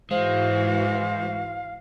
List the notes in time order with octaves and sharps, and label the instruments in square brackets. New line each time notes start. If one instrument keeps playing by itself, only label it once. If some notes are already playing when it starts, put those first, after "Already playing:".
[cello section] G#2 E3 F#4 [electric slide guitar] G#3 [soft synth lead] C5 [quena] F5